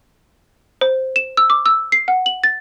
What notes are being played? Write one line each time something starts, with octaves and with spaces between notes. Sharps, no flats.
C5
E7
E6
D6
E6
C7
F#5
F#7
A6